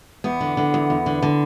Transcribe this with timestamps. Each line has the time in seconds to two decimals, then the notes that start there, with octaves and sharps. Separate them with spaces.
0.24 E2 B3
0.41 D3
0.57 D3
0.74 E2
0.90 E2
1.06 D3
1.22 D3